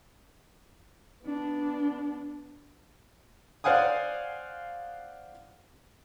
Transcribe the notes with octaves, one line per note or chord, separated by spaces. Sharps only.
B3 D4
C5 D5 F5 F#5 G#5 D#6